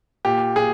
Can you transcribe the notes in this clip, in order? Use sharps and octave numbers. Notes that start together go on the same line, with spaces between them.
A#2 G4
A#2 G#4